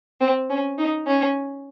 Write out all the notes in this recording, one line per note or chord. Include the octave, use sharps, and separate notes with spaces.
C4
C#4
D#4
C#4